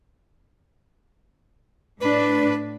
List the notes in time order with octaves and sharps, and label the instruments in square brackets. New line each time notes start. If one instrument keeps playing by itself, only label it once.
[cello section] A2 D4 [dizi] B4